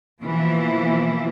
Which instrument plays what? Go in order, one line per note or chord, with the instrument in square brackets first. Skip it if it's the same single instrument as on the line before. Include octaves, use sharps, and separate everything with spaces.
[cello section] B2 E3 F3 A#3 E4